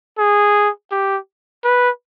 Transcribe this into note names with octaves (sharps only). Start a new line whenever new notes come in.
G#4
G4
B4